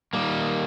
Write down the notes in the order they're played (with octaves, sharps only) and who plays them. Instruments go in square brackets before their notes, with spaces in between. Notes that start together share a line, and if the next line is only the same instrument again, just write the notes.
[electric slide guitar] D#3 G3 A#3